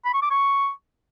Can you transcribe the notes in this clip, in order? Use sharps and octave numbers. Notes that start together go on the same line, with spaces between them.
B5
C#6
D6
C#6